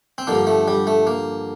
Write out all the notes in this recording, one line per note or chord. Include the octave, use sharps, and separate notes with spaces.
C4
G2 D3 F3 A#3
A3
G3
A3
A#3